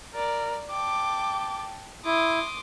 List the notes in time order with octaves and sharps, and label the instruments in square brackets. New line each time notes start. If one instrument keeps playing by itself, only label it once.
[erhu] A#4 [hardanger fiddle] D5
[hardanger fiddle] G5 A5 [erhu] D6
[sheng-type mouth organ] E4 [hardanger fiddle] C6 D6 [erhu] D#6